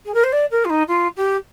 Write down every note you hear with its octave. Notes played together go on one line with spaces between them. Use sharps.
G#4
A#4
C5
D5
A#4
F4
D#4
F4
G4